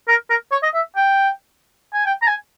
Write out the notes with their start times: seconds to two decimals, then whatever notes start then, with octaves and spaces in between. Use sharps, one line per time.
0.08 A#4
0.30 A#4
0.52 C#5
0.63 D#5
0.74 E5
0.96 G5
1.94 G#5
2.06 G5
2.22 A#5
2.27 G#5